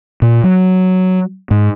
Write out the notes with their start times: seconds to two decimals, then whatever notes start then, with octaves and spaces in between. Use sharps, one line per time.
0.22 A#2
0.43 F#3
1.51 G#2